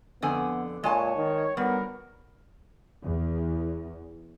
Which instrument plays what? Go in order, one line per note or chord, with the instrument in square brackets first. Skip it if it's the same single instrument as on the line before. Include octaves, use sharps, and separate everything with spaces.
[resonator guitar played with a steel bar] F2 D3 G#5 [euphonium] B3
[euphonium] A#2 [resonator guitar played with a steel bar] G#3 G#5 A5 [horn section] C#5
[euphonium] D#3
[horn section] D3 F#4 A#4 [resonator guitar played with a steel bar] G3 [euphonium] B3
[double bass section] E2